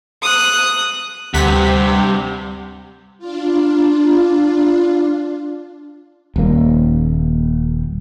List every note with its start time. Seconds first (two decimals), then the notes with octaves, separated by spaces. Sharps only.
0.22 D#6 F#6
1.34 D2 G2 C3 F#5 B6
3.19 D4 F4
6.36 D#1 A#3